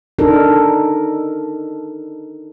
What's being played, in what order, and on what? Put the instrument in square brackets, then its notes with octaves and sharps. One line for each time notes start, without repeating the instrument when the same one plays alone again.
[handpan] D4 D#4 A4 A#4